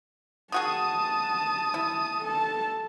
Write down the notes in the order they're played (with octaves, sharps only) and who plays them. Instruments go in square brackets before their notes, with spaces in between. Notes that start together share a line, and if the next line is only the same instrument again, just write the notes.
[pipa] D#3 F#4 G#4 [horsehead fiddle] A5 [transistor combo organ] D#6
[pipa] E4
[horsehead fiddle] A4 A5